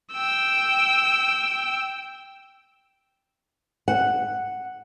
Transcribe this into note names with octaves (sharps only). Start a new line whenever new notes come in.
G5 E6
F#5